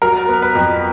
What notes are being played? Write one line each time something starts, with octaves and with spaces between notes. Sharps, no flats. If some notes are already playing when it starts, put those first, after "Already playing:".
F#3 A#4
B3
B4
F2